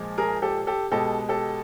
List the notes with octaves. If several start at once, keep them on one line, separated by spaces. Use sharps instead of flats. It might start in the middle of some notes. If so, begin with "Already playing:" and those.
Already playing: A#2 F3 G#3
G#4 A#4
G4 A4
G4 A4
B2 G#3 G4 A4
G4 A4